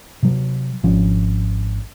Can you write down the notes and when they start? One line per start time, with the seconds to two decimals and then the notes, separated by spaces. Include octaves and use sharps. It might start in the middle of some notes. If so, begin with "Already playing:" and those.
0.23 C3 F#3
0.83 G#1 F3 C#4 D4